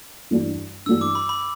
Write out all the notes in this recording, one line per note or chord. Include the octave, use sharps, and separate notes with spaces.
G2 E3 A3 D4 F#4
G2 E3 A3 D4 F#4 E6
D6
B5
B5